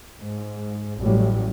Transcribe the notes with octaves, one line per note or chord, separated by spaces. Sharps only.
G#2
A1 A2 F#3 G3